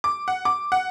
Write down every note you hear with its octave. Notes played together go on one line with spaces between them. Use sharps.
D6
F#5
D6
F#5